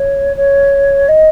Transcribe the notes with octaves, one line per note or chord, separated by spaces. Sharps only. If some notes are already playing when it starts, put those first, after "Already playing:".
Already playing: C#5
C#5
D#5